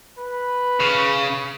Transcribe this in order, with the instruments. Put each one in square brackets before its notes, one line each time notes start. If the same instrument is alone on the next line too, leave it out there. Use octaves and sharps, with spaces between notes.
[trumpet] B4
[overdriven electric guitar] C#3